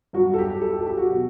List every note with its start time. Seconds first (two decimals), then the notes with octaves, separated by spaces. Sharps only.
0.13 G2 F#3 F#4
0.34 A4
0.38 G4
0.62 A4
0.73 G4
0.80 A4
0.86 G4
0.97 F#4
1.10 B2 F#3